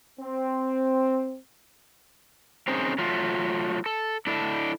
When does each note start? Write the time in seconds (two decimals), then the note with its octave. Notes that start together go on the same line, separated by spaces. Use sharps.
0.20 C4
2.68 C4 C#4 D#4 G#4 A#4 C5
2.98 F#3 A3 F4
3.86 A4
4.27 D4 E4 A4